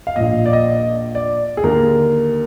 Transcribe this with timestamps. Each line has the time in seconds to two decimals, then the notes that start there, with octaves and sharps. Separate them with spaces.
0.07 F5
0.16 A#1 A#2 D#5
0.46 D5
0.53 D#5
1.15 D5
1.57 G#4
1.64 D#2 D3 A#4